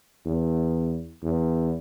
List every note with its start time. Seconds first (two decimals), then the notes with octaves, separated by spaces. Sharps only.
0.26 E2
1.23 E2